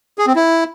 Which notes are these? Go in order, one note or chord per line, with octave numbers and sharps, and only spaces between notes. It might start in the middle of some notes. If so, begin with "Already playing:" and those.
G#4
C4
E4